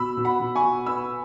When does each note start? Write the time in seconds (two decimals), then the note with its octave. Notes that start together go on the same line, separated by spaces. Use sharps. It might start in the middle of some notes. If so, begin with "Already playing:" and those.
Already playing: B2 B5 E6
0.17 B2
0.25 F#5 B5
0.40 B2
0.55 G#5 C#6
0.63 B2
0.86 B3 B5 E6